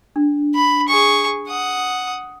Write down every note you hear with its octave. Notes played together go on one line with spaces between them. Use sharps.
D4
B5
G#4 C#6
F#5 D#6